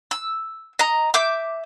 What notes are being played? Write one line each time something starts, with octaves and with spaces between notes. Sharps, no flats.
E6
D#5 A#5
E5 D6 G6